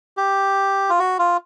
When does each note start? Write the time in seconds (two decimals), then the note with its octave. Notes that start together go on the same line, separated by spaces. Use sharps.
0.17 G4
0.89 F4
0.99 F#4
1.19 F4